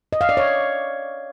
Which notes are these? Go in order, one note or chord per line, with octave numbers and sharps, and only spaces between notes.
D#5
F5
D5
C#5